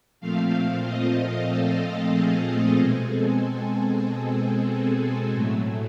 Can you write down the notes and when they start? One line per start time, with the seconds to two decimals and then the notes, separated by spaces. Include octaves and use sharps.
0.20 A#2 F3 A3 C4 F5
0.84 D#5
1.49 A4
2.12 G#4
2.76 B2 G#3 C4 G#4
3.08 A4
3.40 G#4
3.73 G#4
5.32 A2 F#3 A3